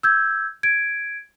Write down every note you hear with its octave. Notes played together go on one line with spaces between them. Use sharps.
E6 G6 G#6
G#6 D7